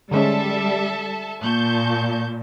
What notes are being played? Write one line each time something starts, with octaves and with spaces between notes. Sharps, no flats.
D3 G3 G#3 C#4 A4 E5 A5
A#2 A5 C#6 G6